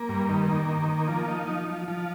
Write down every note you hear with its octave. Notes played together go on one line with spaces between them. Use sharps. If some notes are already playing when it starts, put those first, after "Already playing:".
Already playing: A#3
G2
D#3
A#3
D#3
A#3
F3
D#4
F3
F3
F3